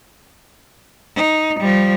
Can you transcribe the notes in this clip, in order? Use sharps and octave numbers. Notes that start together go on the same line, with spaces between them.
D#4
F3 G3